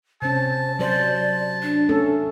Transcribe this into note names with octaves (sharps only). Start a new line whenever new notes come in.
C3 C#4 C5 A5
F#3 C5 D5
D4
A3 C#4 A4